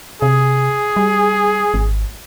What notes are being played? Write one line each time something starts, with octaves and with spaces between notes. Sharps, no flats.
C3 G#4
G3
G#1